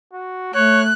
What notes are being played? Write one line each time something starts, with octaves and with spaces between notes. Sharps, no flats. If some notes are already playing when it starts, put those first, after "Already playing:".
F#4
A3 C#5 F#6